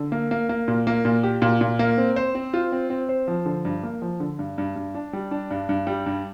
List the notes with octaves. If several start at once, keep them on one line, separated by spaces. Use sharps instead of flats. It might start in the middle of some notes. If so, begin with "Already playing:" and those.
Already playing: D3
A#3
A#3
A#3
A#2
A#3
A#2
G4
A#2
A#2
A#3
C4
C5
C4
F4
C4
C4
C5
F3
D3
G2
A#3
F3
D3
G2
G2
G2
D4
G3
D4
G2
G2
G3
G2